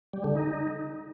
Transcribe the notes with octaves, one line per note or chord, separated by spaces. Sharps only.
G3
D3
D#4